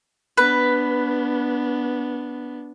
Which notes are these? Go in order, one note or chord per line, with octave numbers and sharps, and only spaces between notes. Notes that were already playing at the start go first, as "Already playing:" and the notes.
B3 D4 B4